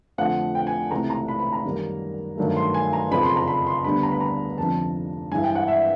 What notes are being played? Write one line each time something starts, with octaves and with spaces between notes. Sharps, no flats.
F2 D3 F3 A3 F#5
G5
G#5
C#2 C3 E3 A3 A#5
A#5
B5
B5
A#5
F#2 D#3 G3 A#3
G2 D#3 F#3 A3
C6
G#5
A#5
F#1 F2 C#3 F3 B5
C6
A#5
B5
C6
D2 D3 G3 B3 D4 B5
A#5
B5
A#5
F1 F2 D3 F3 A5
G2 E3 G#3 G#5
G5
F#5
E5